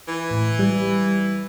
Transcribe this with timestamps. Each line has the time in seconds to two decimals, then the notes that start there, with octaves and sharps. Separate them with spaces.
0.08 E3
0.31 A2
0.59 G3